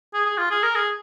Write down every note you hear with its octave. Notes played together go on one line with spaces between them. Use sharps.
G#4
G#4
F4
G#4
A#4
G#4